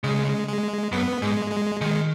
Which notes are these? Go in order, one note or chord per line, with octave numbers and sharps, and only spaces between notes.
C#3 G#3
G#3
F#2 B3
G#2 G#3
G#3
D#3 G#3